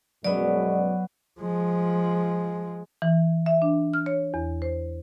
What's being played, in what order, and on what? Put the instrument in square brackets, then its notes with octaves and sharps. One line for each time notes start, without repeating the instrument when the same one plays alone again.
[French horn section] F#2 B2 G#3 [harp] F#3 B3 [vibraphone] D5
[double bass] F3 G#3
[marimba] E3
E5
D4
F6
C#5
E2
C5